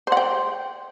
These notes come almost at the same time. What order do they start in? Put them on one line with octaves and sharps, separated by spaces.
C5 F#5 G5